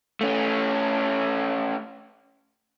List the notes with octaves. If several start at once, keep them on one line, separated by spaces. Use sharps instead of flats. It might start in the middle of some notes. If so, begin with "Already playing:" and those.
A3 C#4